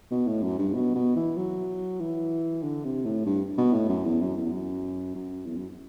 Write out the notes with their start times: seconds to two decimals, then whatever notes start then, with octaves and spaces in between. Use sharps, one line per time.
0.11 B2
0.27 A2
0.43 F#2
0.58 G2
0.74 B2
0.95 B2
1.16 E3
1.37 F#3
2.00 E3
2.63 D3
2.84 C3
3.05 A2
3.26 G2
3.58 B2
3.73 A2
3.89 F#2
4.05 E2
4.21 F#2
4.36 E2
4.52 F#2
5.15 F#2
5.45 E2
5.56 F#2